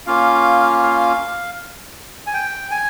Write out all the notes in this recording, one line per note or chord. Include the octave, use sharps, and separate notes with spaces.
A#3 C#4 F4 F5
F5
G#5
G5
G#5